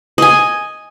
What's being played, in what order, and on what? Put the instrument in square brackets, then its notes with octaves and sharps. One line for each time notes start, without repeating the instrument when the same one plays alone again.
[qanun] D#5 G#5